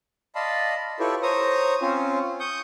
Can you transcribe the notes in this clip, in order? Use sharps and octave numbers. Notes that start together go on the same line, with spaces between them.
D5 D#5 F5 A5 B5 C6
E4 F4 G4 A4 B4 C#5
C5 C#5 A#5 D#6
C4 C#4 F4
C#6 D#6 G6